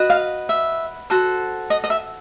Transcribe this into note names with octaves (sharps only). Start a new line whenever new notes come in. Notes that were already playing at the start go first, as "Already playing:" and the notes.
Already playing: F#4 B4 D#5
F5
E5
F#4 A4 C5
D#5
D#5
E5